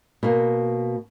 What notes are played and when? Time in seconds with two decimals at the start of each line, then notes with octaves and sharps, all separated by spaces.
0.23 B2 A#3